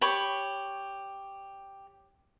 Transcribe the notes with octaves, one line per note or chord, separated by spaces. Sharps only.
G4 C#5 B5